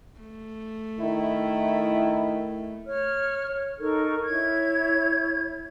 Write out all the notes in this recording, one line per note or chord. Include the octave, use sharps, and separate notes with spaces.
A3
D#3 E4
C#5 F6
D#4 A4 A#4 C#6
E4 C#5 G#6